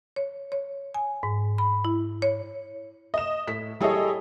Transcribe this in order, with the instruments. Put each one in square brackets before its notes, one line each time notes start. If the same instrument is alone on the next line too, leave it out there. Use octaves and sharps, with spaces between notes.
[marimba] C#5
C#5
G#5
G#2
B5
E4
C#5
[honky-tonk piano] D#5 E7
[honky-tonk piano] A2 [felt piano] B6
[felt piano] G3 G#4 A4 [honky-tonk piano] E4 C#5 D#5